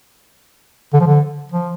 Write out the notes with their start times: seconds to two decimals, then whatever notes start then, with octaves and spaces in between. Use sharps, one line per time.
0.93 D3
1.00 F3
1.07 D3
1.52 F3